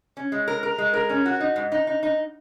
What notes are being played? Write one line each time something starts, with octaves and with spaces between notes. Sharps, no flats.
C#4
G#3
A#4
A#4
G#3
A#4
C#4
F#4
D#4
G#2
D#4
D#4
D#4